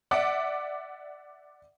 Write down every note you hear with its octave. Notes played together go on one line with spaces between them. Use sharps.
D5 E5 F#5 D6